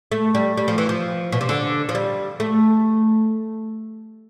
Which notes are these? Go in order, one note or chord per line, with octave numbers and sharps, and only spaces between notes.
A3
G3
G3
F3
E3
F3
B2
C3
D3
F3
G3
A3